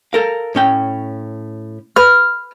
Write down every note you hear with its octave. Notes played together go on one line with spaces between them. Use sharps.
A4 A#4 F5
A2 C#4 G5
B4 F6